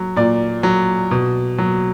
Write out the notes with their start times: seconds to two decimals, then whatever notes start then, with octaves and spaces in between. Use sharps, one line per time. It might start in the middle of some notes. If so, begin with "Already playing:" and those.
Already playing: F#3
0.16 A#2 D5
0.63 F#3
1.11 B2
1.58 F#3